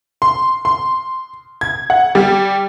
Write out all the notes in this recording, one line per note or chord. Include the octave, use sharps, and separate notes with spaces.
C6
C6
G#6
F#5
G3